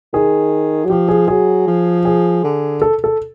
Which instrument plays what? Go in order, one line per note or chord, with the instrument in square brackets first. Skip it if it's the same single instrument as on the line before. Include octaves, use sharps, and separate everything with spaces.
[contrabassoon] D#3 [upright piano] G#4
[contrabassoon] F#3
[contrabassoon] F3 [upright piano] G4
[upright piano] G#4
[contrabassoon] F#3 [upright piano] G#4
[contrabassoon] F3
[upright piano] G#4
[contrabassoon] D3
[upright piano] A4
A4